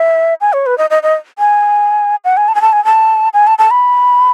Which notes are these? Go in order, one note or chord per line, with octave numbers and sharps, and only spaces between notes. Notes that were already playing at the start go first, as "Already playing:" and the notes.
Already playing: E5
G#5
C#5
B4
D#5
D#5
D#5
G#5
F#5
G#5
A5
G#5
A5
G#5
A5
G#5
A5
A5
B5